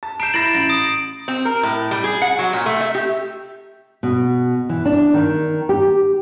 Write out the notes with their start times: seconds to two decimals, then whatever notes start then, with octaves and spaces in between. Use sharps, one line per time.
0.03 A5
0.20 A#5 G6 C7 D7 E7
0.34 E4 B5 A6 A#6 D7 F#7
0.55 A1 A#6
0.70 D#6 D7
1.28 C4
1.45 A#4
1.63 A2
1.91 G3
2.04 G#4
2.22 F#5
2.39 F#3
2.53 A#2
2.66 A3
2.81 E5
2.95 G4
4.03 B2
4.69 E3
4.85 D4
5.14 D#3
5.69 G4